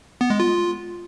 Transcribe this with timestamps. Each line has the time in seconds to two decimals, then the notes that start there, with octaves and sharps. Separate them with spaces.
0.21 B3
0.30 G#3
0.40 F4